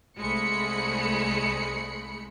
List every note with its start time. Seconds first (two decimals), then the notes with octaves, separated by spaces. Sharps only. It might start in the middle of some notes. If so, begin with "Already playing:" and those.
0.18 C2 G#3 A3 B5 C#7